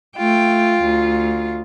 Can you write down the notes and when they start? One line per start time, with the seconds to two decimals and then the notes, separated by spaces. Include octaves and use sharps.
0.17 A3 F4 G5
0.82 D2